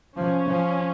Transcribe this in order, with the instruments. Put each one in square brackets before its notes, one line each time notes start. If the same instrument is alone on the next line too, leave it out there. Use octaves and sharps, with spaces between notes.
[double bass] F3 [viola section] C#4
[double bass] F3